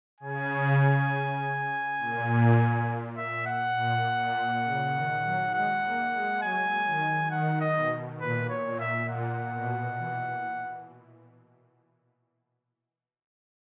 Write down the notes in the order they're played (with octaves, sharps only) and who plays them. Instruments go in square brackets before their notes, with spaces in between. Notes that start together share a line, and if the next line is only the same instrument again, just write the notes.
[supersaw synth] C#3 [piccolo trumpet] G#5
[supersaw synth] A#2
[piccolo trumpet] E5
F#5
[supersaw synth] A#2
A#2
C#3
D#3
F#3
[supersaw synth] G#3 [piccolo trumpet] F#5
[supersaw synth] A#3
G#3
[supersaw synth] F#3 [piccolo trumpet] G#5
[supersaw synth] D#3
[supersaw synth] D#3 [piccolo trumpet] F#5
[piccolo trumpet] D#5
[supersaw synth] B2
[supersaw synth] A#2 [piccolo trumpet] B4
[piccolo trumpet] C#5
[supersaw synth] A#2
[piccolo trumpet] E5
[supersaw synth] A#2 [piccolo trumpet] F#5
[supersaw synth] B2
E3